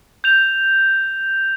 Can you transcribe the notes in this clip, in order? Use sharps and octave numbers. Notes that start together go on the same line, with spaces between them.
G6 F7